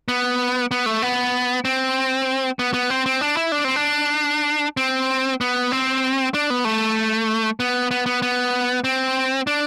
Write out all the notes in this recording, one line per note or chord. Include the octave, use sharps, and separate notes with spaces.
B3
B3
A3
B3
C4
B3
B3
C4
C4
D4
E4
D4
C4
D4
C4
B3
C4
D4
B3
A3
B3
B3
B3
B3
C4
D4